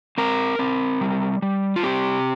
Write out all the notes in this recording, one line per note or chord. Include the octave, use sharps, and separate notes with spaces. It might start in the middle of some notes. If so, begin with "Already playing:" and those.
C4 A#4
C4
G3
G3
F4
C4 G4